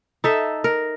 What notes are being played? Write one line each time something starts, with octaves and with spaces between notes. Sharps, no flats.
D#4 A4 E5
A#4